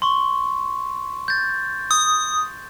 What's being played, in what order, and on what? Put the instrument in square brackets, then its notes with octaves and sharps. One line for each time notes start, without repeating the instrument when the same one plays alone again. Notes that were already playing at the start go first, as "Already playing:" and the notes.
[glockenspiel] C6 C#6
G6 A6
[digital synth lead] D#6